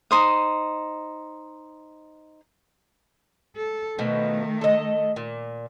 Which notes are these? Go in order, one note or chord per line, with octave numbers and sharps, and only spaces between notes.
D#4 C5 D#6
A4
B2 D#3 F3 A3
A4 D#5
A#2